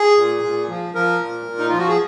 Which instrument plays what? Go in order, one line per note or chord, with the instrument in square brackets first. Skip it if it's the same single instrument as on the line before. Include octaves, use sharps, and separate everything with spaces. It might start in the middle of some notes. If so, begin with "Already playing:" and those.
Already playing: [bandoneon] G#4
A#2
A#2
F3
F3 A#4
A#2
A#2
D#4
F3 F4
F#4
G#4